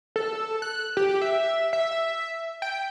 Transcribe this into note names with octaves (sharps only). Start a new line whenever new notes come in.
A4
F#6
G4
E5
E5
G5